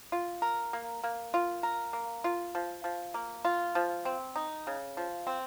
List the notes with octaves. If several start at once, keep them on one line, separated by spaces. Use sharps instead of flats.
F4
A#4
A#3
A#3
F4
A#4
A#3
F4
F3
F3
A#3
F4
F3
C4
D#4
C#3
F3
C4